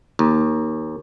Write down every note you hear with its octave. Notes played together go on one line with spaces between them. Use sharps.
D#2